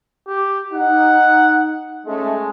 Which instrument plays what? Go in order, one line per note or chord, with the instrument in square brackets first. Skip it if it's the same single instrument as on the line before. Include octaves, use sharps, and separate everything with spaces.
[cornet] G4
[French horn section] D#4 [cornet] F#5
[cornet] G#3 [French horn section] A3 C#4